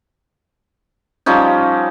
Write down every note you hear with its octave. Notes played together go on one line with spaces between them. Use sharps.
F3 G3 C#4 D#4